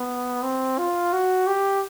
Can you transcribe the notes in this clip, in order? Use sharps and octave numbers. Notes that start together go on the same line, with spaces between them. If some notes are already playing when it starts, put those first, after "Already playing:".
Already playing: B3
C4
F4
F#4
G4